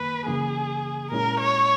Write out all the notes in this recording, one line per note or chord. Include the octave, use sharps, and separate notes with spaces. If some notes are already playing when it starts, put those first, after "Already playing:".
Already playing: F#2 D#3 A#3 B4
F#2 C#3 E3 A#3 G#4
A#2 G#3 C#4 E4 A#4
C#5